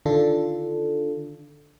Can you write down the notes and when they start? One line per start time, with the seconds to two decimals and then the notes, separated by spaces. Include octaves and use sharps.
0.06 D3 D#3 D4 F4 A4